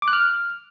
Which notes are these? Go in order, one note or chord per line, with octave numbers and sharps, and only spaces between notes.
D6
F#6
F6